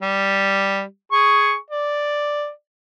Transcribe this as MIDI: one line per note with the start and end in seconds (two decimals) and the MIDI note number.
0.02 0.82 55
1.12 1.55 68
1.12 1.55 85
1.71 2.49 74